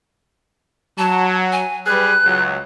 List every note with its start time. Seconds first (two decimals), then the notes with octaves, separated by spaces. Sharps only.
0.98 F#3 A5
1.52 G#5
1.86 G3 G#4 B4 F#6
2.25 C#2 F#3